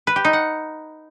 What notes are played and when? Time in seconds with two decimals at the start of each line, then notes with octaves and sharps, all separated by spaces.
0.07 B4
0.16 G4
0.25 D#4
0.33 F#5